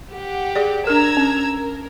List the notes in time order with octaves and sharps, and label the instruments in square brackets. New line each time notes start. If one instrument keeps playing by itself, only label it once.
[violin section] G4 F#5
[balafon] G#4 D5
[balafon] D4 A#4 [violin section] A#5 E6 G#6
[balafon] C#4
[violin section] A#4